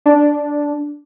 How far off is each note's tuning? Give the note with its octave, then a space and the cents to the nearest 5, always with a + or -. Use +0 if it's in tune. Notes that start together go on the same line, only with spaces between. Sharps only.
D4 -5